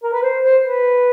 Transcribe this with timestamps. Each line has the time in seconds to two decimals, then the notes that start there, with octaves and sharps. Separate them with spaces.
0.03 A#4
0.13 B4
0.23 C5
0.43 C5
0.62 B4